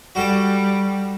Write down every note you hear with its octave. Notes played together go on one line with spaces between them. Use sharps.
G3 F#4 A4 A5